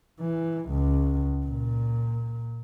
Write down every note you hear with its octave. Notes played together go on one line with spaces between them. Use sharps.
E3
C#2
A#2